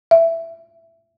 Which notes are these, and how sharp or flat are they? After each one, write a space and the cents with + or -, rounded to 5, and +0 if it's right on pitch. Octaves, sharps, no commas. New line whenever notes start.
E5 +10